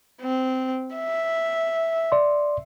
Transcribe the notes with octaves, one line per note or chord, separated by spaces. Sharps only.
C4
E5
D5 C6